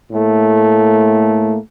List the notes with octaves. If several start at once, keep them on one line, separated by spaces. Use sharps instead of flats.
A2 A3 A#3